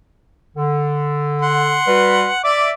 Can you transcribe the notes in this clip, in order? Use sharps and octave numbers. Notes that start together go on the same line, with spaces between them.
D3
F#5 C6
G3 F#4 B4
D5 E5 D6